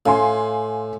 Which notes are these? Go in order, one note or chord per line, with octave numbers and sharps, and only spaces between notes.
A2 F5 G#5 C6